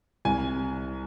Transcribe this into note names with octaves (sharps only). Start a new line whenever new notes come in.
C2 G#5